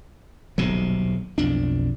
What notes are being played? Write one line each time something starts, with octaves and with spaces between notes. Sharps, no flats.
D#1 B1 C3 F#3
B1 F2 D4